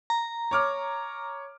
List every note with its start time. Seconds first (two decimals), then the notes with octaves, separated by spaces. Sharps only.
0.10 A#5
0.51 C#5 D6 F6